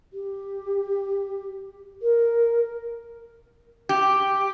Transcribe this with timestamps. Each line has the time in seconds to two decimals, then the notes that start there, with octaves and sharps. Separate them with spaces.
0.13 G4
2.02 A#4
3.89 G4